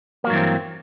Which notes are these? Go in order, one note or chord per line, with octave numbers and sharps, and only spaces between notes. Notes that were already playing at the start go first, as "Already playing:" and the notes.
G2 E3 F#3 A#3 C4